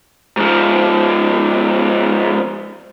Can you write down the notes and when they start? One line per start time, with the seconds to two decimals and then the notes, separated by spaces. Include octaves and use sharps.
0.37 G#2 F3